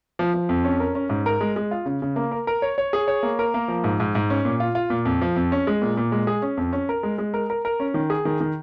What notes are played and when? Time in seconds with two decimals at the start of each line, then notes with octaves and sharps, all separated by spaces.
0.19 F3
0.34 F3
0.49 F2
0.64 C#4
0.80 A#4
0.95 C#4
1.10 G#2
1.26 A#4
1.41 G#3
1.56 G#3
1.71 F4
1.86 C#3
2.02 C#3
2.16 A#3
2.32 A#4
2.47 A#4
2.62 C#5
2.78 C#5
2.93 G#4
3.08 C#5
3.23 A#3
3.39 A#4
3.54 A#3
3.68 F3
3.84 G#2
4.00 G#2
4.15 G#2
4.30 C#4
4.45 A#2
4.60 F4
4.75 F4
4.90 A#2
5.05 F2
5.22 F3
5.36 F2
5.52 C#4
5.67 G#3
5.82 A#2
5.97 A#2
6.12 G#3
6.27 G#4
6.42 C#4
6.57 F2
6.73 C#4
6.89 A#4
7.03 G#3
7.18 G#3
7.34 A#4
7.50 A#4
7.65 A#4
7.80 C#4
7.94 D#3
8.10 G#4
8.25 D#3
8.41 D#3